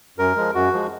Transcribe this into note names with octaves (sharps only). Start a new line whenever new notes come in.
F#2 A#4
F3 G#3
F#2 F#4
F3 G#3